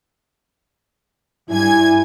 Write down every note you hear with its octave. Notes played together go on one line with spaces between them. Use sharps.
G2 E4 G#5 G#6